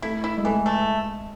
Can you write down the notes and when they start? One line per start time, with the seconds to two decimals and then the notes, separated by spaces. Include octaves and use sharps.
0.02 A3 E4
0.24 E4
0.37 G#3
0.45 E3 A3
0.66 A3